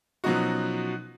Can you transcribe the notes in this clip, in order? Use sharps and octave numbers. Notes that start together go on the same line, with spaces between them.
B2 F3 F#3 C#4 D#4 F#4